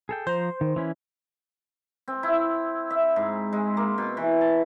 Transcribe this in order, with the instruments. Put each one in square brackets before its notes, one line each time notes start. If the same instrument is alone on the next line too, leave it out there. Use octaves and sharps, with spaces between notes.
[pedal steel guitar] G#4 A4 G5
[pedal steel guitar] F3 A#5 [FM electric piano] C5
[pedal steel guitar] D#3
E3 C#4 E4
[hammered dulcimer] C4
E4
E5
G#2
G#3
A#3
B2
E3
A5